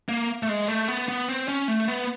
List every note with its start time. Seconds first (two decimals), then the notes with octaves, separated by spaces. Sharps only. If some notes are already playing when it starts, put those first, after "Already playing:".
0.09 A#3
0.43 A3
0.49 G#3
0.68 A3
0.88 B3
1.09 B3
1.28 C4
1.48 C#4
1.68 A3
1.88 B3